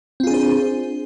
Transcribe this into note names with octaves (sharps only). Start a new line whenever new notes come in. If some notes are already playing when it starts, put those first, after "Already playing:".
C4 D4 F4 G#4 C5